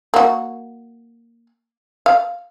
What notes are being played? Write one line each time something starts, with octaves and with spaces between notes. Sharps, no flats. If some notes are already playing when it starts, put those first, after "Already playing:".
A#3 F#4
F5